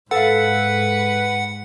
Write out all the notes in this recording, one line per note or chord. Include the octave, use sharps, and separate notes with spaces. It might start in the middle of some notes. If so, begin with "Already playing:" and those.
G#2 A4 B4 F5 F#5